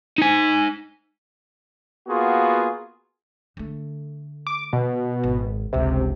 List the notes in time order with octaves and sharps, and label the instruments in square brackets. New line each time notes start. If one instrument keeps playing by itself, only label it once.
[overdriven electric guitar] D#4 G#5
[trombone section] A#3 B3 F4 F#4 G#4
[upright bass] D3 A3
[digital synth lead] D6
B2
[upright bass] G#1
[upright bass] G1 C#2 [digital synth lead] C3